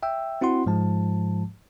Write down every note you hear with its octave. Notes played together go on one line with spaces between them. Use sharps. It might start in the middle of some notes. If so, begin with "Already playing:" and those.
E5 G5 E6
C4 E4 F#4 F#5 C6
G#2 F3 G#3 A5